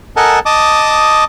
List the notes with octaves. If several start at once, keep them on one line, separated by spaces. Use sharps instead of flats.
A4 A#4 D#5 F#5 G#5 A5
D#5 A5 D6 D#6